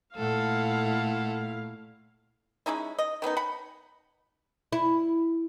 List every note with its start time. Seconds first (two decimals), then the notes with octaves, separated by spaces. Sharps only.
0.16 A#2 A3 E4 A4 F5 F#5
2.66 G#3 C#4 D#4 E4
2.98 D#5
3.22 D#3 B3 C#4 D#4
3.37 F#5 B5
4.72 E4